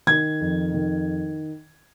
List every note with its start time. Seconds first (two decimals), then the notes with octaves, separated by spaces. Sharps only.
0.07 D#3 G#6
0.41 F2
0.73 D#3